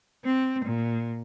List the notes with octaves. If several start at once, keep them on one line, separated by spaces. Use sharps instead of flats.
C4
A#2